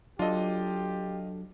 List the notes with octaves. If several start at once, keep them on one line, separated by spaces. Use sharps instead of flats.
F#3 D4 F4 G4 A4 D#5